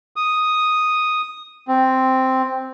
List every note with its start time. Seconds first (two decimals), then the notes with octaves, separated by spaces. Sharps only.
0.16 D#6
1.68 C4